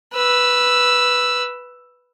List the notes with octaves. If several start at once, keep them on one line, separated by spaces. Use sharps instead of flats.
B4 E6